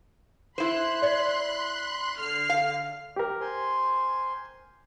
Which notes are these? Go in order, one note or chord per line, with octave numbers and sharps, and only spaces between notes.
E4 C5 B5 C6 F#6
D5
D3 F6 C7
F5
G4 A#4
C5 G#5 C6